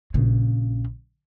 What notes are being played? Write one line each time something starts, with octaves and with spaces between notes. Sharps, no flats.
A#1 C#3